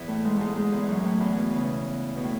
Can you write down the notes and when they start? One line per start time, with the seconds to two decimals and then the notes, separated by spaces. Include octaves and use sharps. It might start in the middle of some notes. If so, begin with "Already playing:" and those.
Already playing: E2 E3
0.08 A2 A3
0.24 G#2 G#3
0.36 G#2 G#3 A3
0.56 G#2 G#3
0.72 E2 E3
0.83 E3
0.88 F#2 F#3
1.04 A2 A3
1.20 E2 E3
1.37 B2
1.52 C#3
2.16 B2
2.24 A2